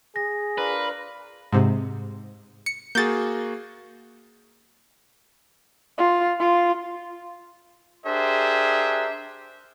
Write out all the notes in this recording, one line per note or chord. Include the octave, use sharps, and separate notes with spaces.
G#4 A#6
D4 F4 A#4 B4
G#2 C3
C#7
A#3 F#4 G#4 G6 A6
F4
F4
D4 G4 G#4 A#4 C5 E5